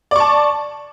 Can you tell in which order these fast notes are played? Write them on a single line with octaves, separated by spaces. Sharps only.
D5 C#6 A5